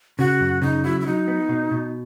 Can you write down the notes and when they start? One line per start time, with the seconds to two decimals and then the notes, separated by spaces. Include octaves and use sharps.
0.19 C#3 F#4
0.41 F#2
0.62 C#3 D#4
0.84 F#3 E4
1.01 E4
1.06 F#3 D#4
1.28 B3
1.49 B2
1.71 B2